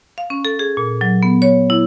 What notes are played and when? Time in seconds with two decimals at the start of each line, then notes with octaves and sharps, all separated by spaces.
0.18 F5
0.30 C#4
0.45 A4
0.59 G#4
0.77 A#2
1.01 F#3
1.23 B3
1.42 C#5
1.70 E4